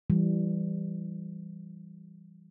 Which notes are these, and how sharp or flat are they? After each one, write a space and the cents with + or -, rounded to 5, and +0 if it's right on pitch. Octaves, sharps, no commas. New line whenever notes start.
E3 +20 G3 +0